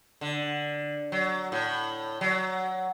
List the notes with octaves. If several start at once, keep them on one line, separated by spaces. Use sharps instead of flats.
D3
F#3
A2
F#3